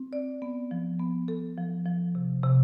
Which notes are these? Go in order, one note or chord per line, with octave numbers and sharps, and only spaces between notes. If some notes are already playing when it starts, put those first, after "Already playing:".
Already playing: C4
D5
B3
F3
B3
A4
F3
F3
C3
C3